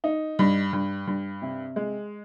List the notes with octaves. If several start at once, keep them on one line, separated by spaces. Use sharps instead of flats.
D#4
G2
G2
G2
C3
G#3